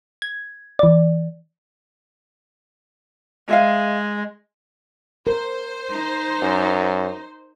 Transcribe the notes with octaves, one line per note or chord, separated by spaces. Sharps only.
G#6
E3 D5
G#3 G#4 E5 F5
A#4 C5
D#4
F#2